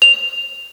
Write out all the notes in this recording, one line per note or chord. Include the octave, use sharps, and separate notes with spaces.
F7